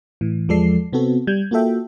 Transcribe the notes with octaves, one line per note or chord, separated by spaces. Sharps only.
A2 E3
E2 F3 G#3 A4 D5 C7
C3 B3 C4 F#4 A4
G3 G6 G#6
A#3 F4 F#4 A4 E5 G5